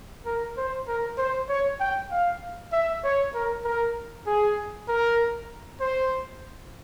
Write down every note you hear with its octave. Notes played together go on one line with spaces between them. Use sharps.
A#4
C5
A#4
C5
C#5
G5
F5
E5
C#5
A#4
A#4
G#4
A#4
C5